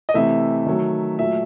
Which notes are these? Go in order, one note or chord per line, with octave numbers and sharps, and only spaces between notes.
D#5
C3 E3 A3 E5
D#3 F#3 A3
A#2 F#3 A3 E5